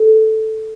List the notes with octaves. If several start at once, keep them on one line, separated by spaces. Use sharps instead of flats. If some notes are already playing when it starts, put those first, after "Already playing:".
Already playing: A4